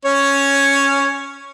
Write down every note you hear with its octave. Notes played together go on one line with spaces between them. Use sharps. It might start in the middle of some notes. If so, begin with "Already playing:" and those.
C#4 C#5